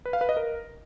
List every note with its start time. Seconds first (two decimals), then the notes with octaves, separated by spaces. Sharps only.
0.06 B4
0.13 F5
0.21 B4
0.29 D#5
0.37 A#4